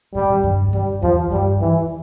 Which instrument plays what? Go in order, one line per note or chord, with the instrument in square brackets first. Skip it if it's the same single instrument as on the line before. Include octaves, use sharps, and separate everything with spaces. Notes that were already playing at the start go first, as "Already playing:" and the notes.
[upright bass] A2 [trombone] G3
[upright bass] A#2
G2
A2
[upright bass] G2 [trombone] G3
[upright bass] E2 [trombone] F3
[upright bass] G2 [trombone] G3
[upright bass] E2 [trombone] E3